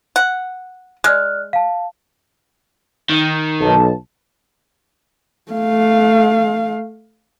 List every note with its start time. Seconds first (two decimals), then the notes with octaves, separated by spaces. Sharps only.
0.16 F#5
1.04 G#3 D5 F6 F#6
1.53 F5 A5
3.10 D#3
3.61 B1 B2 A5
5.52 A3 F5